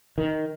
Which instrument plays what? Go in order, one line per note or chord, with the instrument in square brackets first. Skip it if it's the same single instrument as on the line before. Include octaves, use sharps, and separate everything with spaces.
[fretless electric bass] D#3